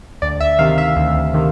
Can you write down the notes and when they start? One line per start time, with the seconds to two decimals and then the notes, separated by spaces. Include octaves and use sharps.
0.22 D2 D5
0.40 E5
0.59 C3 D#3 F5
0.78 E5
0.96 D2
1.34 C3 D#3